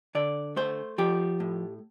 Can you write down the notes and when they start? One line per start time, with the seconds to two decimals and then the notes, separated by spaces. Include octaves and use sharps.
0.15 D3 D5
0.56 A3 C5
0.98 F3 G4
1.40 A2